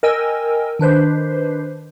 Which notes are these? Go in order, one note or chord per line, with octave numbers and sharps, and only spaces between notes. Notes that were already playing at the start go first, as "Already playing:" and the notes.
A#4 D#5 G5 G#5 E6
D#3 D4 B4 C5